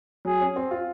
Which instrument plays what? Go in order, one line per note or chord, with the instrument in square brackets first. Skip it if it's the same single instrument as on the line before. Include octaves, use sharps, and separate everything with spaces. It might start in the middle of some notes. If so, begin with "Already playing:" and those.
[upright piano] F#3 [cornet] G#4
[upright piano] C#4
C4
F4